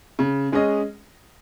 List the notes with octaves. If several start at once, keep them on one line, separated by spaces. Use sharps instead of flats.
C#3
G#3 C#4 G#4 D#5